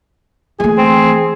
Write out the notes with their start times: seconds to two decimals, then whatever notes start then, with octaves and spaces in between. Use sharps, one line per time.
0.60 E3 A3 G#4
0.78 C4